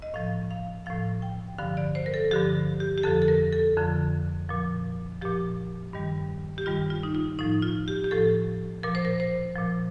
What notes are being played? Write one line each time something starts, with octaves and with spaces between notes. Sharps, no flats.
D#5
A2 F3 F5
F5
A2 F3 F5
G5
G2 D3 F3 F5
D5
C5
A#4
A4
G2 D3 F3 G4
G4
G4
F2 D3 F3 A4
A4
A#4
A4
F2 D3 F3
A#2 F3
A#2 F3 G4
G2 D#3 G3
G4
G2 D#3 G3 F4
F4
D#4
F4
A2 F3 D#4
F4
G4
G4
A2 F3 A4
A#2 F3 A#4
C5
A#4
C5
A#2 F3